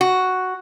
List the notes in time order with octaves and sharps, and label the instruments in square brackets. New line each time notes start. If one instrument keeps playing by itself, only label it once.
[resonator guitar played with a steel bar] F#4